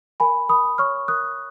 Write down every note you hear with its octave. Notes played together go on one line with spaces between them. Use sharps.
A#4 G#5 B5
A#4 B5 D#6
C#5 C#6 F6
A#4 D#6 F#6